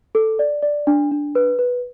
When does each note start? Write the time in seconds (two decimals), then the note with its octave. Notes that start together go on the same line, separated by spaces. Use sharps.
0.15 A4
0.39 D5
0.62 D5
0.87 D4
1.11 D4
1.35 B4
1.59 B4